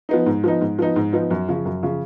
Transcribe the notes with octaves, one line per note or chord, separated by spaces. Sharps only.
F3 B3 D#4
G#2
F3 B3 D#4
G#2
F3 B3 D#4
G#2
F3 B3 D#4
F#2
C#3 F3
F#2
C#3 F3